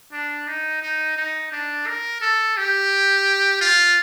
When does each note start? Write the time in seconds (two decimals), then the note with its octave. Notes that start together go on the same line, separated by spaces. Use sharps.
0.12 D4
0.48 D#4
0.83 D#4
1.16 D#4
1.52 D4
1.87 A#4
2.21 A4
2.57 G4
3.61 F4